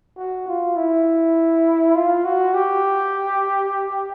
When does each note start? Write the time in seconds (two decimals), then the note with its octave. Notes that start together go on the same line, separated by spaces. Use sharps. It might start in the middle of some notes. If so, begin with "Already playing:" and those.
0.17 F#4
0.48 F4
0.76 E4
1.95 F4
2.25 F#4
2.54 G4